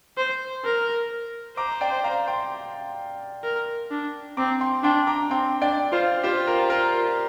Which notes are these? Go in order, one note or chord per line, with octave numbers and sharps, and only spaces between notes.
C5
A#4
C5 A#5 D6
D5 G5
F5 A#5
G5 C6
A#4
D4
C4 A#5 D6
G5 C6
D4 G5 C6
A#5 D6
C4 G5 C6
D4 D5 G5
F4 C5 F5
F4 G4 C5
A#4
A#4